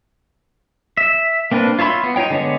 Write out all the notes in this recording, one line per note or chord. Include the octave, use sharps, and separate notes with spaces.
E5
A#3 C4 D4 B4
F4 C#5 E5 B5 C6
B3
D#4 F4 C#5 G5
D3 G#3 B3 D4 C#5